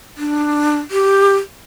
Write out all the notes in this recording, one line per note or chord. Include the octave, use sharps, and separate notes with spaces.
D4
G4